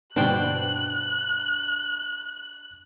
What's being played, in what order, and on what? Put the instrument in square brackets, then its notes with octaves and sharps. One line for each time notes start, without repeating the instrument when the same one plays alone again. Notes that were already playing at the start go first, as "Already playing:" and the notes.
[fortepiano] G2 B2 [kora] D4 C5 G5 [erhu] F#6